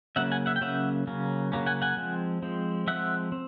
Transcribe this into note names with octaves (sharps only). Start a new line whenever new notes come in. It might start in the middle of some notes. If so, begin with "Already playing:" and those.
C#3 F#3 A#3 C#4 E5 F#5
F#5 G#5
E5 F#5
G5
C#3 F#3 A#3 C#4 E5 F#5
C#3 F#3 A#3 C#4
C#3 F#3 A#3 C#4
F#5 G#5
F#5 G#5
F3 G#3 C4
F3 G#3 C4
F3 G#3 C4 E5 F#5
C4